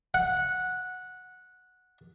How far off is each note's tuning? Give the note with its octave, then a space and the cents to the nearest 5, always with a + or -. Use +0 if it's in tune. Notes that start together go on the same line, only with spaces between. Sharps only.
F#5 -10